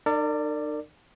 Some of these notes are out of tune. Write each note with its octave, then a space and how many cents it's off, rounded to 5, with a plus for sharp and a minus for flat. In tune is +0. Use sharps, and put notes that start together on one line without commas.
D#4 -45 A#4 -40 D5 +5